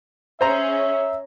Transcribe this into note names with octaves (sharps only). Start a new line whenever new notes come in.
C#4 G#4 C5 E5 A#5